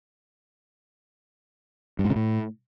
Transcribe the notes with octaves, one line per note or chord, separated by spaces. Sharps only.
G2
G#2
C#3
A2